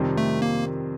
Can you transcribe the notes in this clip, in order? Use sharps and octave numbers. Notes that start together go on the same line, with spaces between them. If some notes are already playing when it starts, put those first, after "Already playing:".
Already playing: F2 C3 D#3 G3 C4
A3
A#3